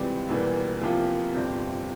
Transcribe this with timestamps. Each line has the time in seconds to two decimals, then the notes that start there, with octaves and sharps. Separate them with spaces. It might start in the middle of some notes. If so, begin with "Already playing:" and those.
Already playing: C#2 C3 E3 G3 C4
0.29 E1 E2 E3 G3 A#3
0.82 C2 C3 F3 A#3 F4
1.34 G1 F2 C3 G3 C4